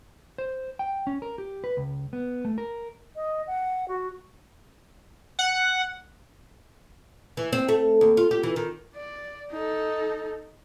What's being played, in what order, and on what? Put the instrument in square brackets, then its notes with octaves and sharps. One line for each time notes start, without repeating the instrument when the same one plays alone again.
[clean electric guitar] C5
G5
C#4
A#4
G4
B4
C#2
B3
A3
A#4
[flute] D#5
F#5
F#4
[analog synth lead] F#5
[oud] E3
C4
A3
D#2
F4
G4
E3
D#3
[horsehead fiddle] D5
D#4 A4